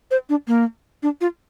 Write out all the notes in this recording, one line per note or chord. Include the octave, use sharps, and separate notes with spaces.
C5
D4
A#3
D4
F4